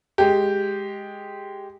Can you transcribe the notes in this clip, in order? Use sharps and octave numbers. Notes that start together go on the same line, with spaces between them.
G#3 G4